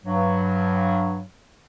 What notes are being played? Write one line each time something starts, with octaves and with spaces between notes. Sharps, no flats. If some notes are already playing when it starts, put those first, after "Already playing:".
G2 F#3